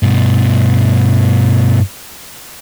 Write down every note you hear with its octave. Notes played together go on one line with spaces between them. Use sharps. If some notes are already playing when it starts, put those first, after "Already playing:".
G2 B2